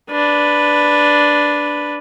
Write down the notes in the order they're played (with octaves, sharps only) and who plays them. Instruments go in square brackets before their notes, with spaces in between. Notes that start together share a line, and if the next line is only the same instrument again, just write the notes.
[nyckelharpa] D4 B4